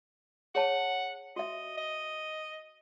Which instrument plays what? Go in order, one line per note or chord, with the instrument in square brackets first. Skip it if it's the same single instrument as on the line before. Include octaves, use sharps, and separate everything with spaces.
[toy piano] G#4 C#5 A5 [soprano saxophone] F#5
[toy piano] F#4 E5 [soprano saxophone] D#5
[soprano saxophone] D#5